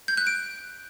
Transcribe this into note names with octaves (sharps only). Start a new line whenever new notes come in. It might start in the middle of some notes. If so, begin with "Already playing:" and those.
G6
F#6
D7